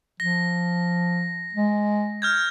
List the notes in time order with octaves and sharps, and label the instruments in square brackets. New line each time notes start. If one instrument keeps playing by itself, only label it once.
[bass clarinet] F3 [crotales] A#6
[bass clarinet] G#3
[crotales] F6 G6 G#6